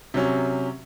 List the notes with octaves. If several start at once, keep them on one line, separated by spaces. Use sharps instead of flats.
C3 F#3 C#4